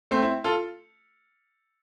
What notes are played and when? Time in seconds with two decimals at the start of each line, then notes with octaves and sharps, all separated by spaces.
0.11 A3 C4
0.22 C4 E4
0.44 F4 A4